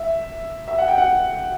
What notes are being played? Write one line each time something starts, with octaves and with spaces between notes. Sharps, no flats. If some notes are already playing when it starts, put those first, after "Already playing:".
Already playing: E5
E5
F#5
G5
F#5